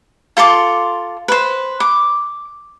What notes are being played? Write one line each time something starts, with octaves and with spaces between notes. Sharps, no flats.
F4 A4 C6 D6
B4 C5
D6